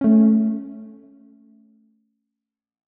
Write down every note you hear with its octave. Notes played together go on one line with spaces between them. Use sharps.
A3 C#4